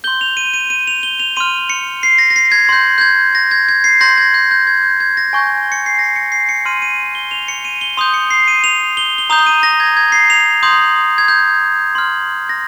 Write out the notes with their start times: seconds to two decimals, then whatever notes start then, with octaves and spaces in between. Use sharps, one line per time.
0.04 G6 G7
0.07 C6
0.21 F7
0.37 D#7
0.54 D#7
0.70 D#7
0.87 F7
1.03 G7
1.20 F7
1.37 C6 F6 D#7
1.70 C#7
2.03 C7
2.18 A#6
2.30 A#6
2.36 C7
2.52 G#6
2.69 C6 G6
2.98 G6
3.01 G#6
3.35 A#6
3.51 G#6
3.69 G#6
3.84 C7
4.01 C6 G6 A#6
4.18 G#6
4.34 G6
4.51 G6
4.67 G#6
4.83 G6
5.00 G#6
5.17 A#6
5.33 G#5 C#6 G6
5.72 C#7
5.86 C7
5.99 A#6
6.16 C#7
6.32 C7
6.49 C#7
6.65 C6 F6 D#7
6.82 D#7
7.15 G7
7.31 F7
7.48 C#7
7.65 D#7
7.81 G7
7.97 C6 D#6 G6 F7
8.14 C#7
8.31 C7
8.48 D#7
8.64 F7
8.97 G7
9.18 G7
9.30 A#5 D#6 G6 F7
9.46 D#7
9.63 A#6
9.80 G#6
9.97 G#6
10.12 C7
10.30 F7
10.63 C6 D#6 G6
11.18 G#6
11.28 G6
11.95 C6 F6
12.49 A#6